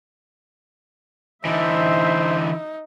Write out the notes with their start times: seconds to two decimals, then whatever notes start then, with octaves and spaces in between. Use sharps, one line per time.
1.45 D3 E3 D#4 C5 E5